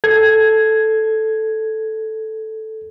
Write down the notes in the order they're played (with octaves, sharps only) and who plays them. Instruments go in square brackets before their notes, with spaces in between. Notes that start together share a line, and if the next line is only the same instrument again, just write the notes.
[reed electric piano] A4 G#6